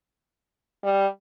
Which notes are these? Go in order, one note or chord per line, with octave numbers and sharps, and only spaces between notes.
G3